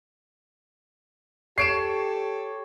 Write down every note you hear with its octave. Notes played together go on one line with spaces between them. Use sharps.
G4 A4 C#5 D6 C7 D7 E7